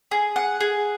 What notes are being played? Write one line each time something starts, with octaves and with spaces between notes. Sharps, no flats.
G#4
F#5
G#4